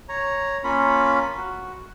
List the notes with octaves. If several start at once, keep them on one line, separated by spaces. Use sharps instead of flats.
C#5 A#5
A#3 C#4 F4 B5
F#4